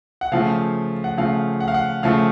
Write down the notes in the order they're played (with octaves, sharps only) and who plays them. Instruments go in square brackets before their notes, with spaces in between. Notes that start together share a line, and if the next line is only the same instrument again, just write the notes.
[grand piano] F#5
C#3 F3 A3 F5
F#5
C#3 F3 A3 F5
F#5
F5
F#5
C#3 F3 A3 F5